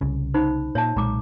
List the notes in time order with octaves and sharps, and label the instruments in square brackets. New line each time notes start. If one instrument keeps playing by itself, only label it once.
[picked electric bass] C2 C#3
[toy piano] D#4 C5 B5
[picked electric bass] A#2 [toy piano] C#5 E5 A5
[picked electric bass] B1 A#2 G#3 [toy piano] A#5 D6